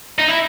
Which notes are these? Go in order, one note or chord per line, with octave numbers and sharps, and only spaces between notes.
D#4
E4